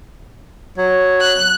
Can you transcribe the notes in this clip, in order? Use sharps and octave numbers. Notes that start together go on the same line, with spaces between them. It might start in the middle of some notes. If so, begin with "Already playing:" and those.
F#3
F#6